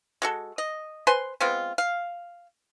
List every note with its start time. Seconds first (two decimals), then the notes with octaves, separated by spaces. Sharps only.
0.22 G#3 F#4 A4
0.58 D#5
1.07 B4 C5 G#5 C6
1.41 G#3 B3 C4 F4
1.78 F5